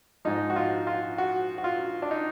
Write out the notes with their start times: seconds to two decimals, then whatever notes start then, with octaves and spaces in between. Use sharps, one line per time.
0.25 G#2 F3 D#4
0.50 F#4
0.56 F4
0.87 F4
1.18 F#4
1.58 F#4
1.64 F4
2.02 D4
2.11 D#4